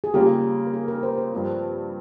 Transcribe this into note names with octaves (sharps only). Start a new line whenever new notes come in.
G#4
C#3 G3 A#3 F4 G4
A#4
G#4
A#4
C5
C5
G2 F3 C4